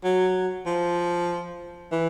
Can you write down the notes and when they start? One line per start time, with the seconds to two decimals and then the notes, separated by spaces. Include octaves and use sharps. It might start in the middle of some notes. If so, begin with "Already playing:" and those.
0.04 F#3
0.66 F3
1.92 E3